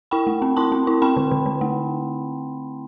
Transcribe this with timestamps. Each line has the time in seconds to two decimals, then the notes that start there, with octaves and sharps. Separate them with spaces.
0.11 E4 G5 B5
0.27 A3
0.42 C4
0.56 E4 A5 C6
0.72 C4
0.87 E4
1.02 C4 G5 B5
1.17 D3
1.31 D3
1.46 D3
1.61 A3